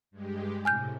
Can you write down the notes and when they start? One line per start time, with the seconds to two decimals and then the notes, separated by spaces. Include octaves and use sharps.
0.11 G2 G#3 G4
0.65 A2 C3 G#5 F6 G6